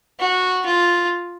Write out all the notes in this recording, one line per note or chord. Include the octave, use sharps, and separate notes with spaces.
F#4
F4